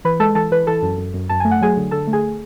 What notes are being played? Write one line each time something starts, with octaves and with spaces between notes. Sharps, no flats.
E3 B4 B5
G#3 A4 A5
E3 A4 A5
E3 B4 B5
E3 A4 A5
F#2
F#2
F#2
F#2 A5
A3 G#5
F#5
F#3 G#4 G#5
D3
D3 A4 A5
A3
G#4 G#5